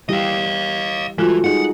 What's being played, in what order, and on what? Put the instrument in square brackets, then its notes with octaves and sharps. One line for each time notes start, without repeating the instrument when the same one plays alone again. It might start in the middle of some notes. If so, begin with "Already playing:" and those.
[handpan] E3 G3 G4 [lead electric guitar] D#5 F5
[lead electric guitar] E3 [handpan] G3 A4 [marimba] G#3 F4 F#4
[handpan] D#4 G#4 D#5 [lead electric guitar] F#5